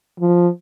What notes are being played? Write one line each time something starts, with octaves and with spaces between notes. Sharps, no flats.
F3